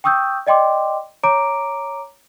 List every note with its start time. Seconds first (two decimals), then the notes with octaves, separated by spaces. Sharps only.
0.04 G5 C#6 D#6 E6 G6
0.47 D5 D#5 G5 C6 D6
1.23 C#5 A#5 D6 D7